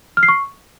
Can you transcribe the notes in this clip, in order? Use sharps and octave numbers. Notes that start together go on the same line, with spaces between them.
F6
C7
C#6